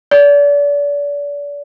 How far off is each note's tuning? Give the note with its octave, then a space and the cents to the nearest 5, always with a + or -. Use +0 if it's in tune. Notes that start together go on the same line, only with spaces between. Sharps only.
D5 -35